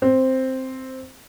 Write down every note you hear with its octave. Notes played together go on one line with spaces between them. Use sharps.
C4